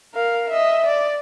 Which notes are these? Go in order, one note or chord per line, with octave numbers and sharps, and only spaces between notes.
A#4 F5
D#5 E5
D5